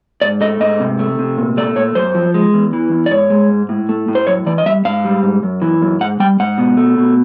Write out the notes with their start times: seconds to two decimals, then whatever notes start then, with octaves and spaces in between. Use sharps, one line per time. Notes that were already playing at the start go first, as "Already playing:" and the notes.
0.22 G#2 D5
0.41 A3 D#5
0.60 G#2 D#5
0.80 C3
0.99 A3
1.19 C3
1.37 A#2
1.57 A3 D5
1.76 A#2 C#5
1.95 F#2 C5
2.15 F3
2.34 G#3
2.54 E2
2.73 E3
2.92 E2
3.06 D5
3.11 G#2 C#5
3.30 G#3
3.50 G#2
3.69 A2
3.89 A3
4.08 A2
4.15 C5
4.27 F#2 C#5
4.46 E3 D5
4.58 D#5
4.66 G3 E5
4.85 G#2 F5
5.05 G3
5.23 G#2
5.43 F#2
5.62 E3
5.82 F#2
6.01 G#2 F#5
6.20 G3 G5
6.40 G#2 F#5
6.58 B2
6.77 A3
6.98 B2